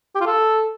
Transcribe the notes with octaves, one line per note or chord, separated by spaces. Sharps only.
G4
F4
A4